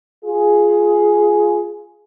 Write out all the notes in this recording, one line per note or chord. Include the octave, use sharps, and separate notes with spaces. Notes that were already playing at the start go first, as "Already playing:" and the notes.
F4 G#4